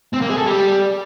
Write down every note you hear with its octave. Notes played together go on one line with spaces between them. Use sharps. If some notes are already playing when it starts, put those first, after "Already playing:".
C4
A#3
G#4
A4
G3